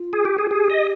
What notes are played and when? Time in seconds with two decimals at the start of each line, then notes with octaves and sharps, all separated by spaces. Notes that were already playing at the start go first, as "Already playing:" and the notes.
Already playing: F4
0.13 G#4
0.25 G4
0.38 G#4
0.45 F4
0.51 G4 G#4
0.70 D#5